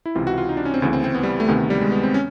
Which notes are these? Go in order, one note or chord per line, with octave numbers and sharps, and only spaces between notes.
E4
C#2 C3 E3 F4
F#4
F4
D#4
D4
C#4
C4
D2 C#3 E3 B3
C4
C4
B3
G3
A3
D2 C3 D#3 B3
G3
G#3
B3
C4
C#4